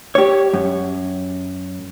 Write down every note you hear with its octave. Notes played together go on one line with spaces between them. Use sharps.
G4 C#5
F#2